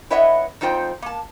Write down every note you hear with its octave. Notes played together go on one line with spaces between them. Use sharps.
E4 B4 C#5 D#5 E5 F#5
F2 D#4 F4 C5 G5
A#3 A5